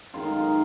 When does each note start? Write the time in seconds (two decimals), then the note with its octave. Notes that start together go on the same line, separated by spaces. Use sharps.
0.14 F#2 D#3 G#3 F4
0.25 D#4
0.37 F4